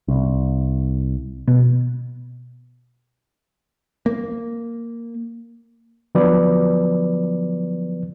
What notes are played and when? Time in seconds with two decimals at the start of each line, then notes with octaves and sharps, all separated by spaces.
0.08 C2
1.48 B2
4.06 A#3
6.15 D3 F3 F#3 B3 B4 D5